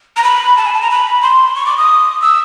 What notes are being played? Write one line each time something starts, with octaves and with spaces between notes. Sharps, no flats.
A#5
B5
A5
G#5
A5
A#5
B5
C6
C#6
D6
D#6
E6